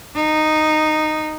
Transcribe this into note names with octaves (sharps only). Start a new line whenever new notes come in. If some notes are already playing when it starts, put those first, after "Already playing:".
D#4